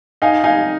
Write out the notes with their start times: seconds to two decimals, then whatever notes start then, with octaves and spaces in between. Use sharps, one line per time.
0.22 D#4 F5 G#5
0.44 D#4 F5 G#5